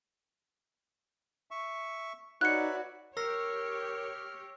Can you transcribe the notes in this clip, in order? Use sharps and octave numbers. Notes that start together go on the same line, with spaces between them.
E5 C#6
D#4 F#4 B4 C#5 D5 E5 F#6 C#7
G4 A#4 C#5 E6 F6 A#6 C7